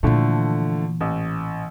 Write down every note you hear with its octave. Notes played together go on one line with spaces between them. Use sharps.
A#2 D3 E3 F3 A3
A1